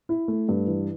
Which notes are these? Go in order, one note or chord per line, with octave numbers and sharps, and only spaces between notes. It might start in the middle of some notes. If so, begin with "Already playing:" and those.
E4
A3
G2
E3